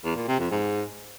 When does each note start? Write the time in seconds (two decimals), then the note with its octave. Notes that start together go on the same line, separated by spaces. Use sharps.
0.05 E2
0.16 A#2
0.28 C3
0.39 F2
0.51 G#2